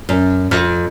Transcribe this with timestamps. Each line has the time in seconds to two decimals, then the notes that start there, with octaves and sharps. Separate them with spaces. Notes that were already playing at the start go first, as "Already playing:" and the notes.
0.09 F#2
0.51 F2